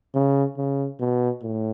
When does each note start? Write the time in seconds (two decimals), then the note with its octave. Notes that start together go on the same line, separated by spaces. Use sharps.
0.15 C#3
0.57 C#3
1.00 B2
1.43 A2